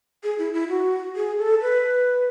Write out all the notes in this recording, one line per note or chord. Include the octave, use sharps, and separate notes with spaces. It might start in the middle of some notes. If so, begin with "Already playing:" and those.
G#4
E4
E4
F#4
G#4
A4
B4